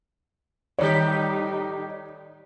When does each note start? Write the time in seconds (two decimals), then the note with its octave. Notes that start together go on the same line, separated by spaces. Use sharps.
0.79 A2 D#3 G3 D#4 G4 C#5 D5